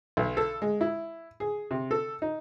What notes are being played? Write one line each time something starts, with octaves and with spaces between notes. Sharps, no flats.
B1
A4
G#3
E4
G#4
C3
A4
D#4